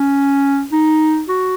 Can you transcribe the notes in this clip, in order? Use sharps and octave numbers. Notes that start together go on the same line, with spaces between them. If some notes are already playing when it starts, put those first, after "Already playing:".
Already playing: C#4
D#4
F#4